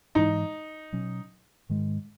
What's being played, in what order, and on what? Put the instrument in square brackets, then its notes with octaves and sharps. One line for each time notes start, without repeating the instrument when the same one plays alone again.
[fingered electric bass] G#2 E3 G#3 [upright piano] D#4
[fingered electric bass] B2 F#3 C#4
G#2 D#3 G#3